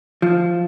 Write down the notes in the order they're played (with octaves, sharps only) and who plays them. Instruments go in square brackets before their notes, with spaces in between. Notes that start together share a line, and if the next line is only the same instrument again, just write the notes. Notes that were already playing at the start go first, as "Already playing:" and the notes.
[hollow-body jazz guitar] F3